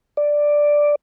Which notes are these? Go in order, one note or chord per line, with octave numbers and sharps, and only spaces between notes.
D5